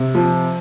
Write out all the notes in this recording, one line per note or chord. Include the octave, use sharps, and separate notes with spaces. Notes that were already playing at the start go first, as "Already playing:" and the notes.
Already playing: C3
F3